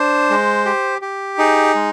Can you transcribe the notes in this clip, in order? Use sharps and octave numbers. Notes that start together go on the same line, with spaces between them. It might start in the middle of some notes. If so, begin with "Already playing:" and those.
Already playing: D4 C5
G#3
G4
G4
D#4 G#4
G#3